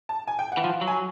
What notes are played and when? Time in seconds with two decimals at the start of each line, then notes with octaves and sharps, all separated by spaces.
0.09 A5
0.27 G#5
0.39 G5
0.52 F#5
0.57 E3
0.63 F3 F5
0.81 F#3
0.87 G#5